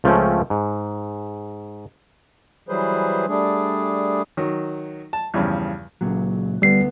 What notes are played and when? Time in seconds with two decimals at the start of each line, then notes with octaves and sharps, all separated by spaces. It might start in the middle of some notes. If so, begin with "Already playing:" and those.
0.04 C#2 F3 A3 C4 C#4 G5
0.50 G#2
2.68 E3 F#3 G3 G#4 B4 C5
3.28 G3 A3 D4 G#4
4.37 D#3 F#3
5.13 A5
5.34 E2 G2 C#3 F3
6.01 C#2 A#2 F#3
6.62 D2 G3 B3 C7